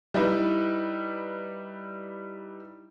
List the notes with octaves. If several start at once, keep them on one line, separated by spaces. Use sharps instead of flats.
G3 D#4 E4 B4